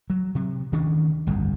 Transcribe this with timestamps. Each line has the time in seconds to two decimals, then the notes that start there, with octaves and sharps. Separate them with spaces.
0.10 F#3
0.35 C3
0.72 D2 D#3 C#4 D4
1.27 G1 C2 F2